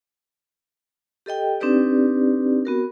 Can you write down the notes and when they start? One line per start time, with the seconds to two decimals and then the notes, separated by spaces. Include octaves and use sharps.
1.26 G4 A4 D#5 G5
1.60 C4 D4 D#4 G4 B4 D5
2.65 B3 F#4 A#4